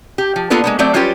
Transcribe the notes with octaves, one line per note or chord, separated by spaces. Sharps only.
G4
F3
A#3 B3 D4 F4 A4 B4
G#3 A#3 B3
F#3 A3 C4 D5 E5
F#3 G3 C#4 F4 G4 B4